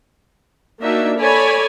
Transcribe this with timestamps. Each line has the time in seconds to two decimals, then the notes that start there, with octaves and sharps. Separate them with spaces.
0.81 A#3 D4 D#4 F#4 E5
1.17 A4 C#5 D5 G#5 B5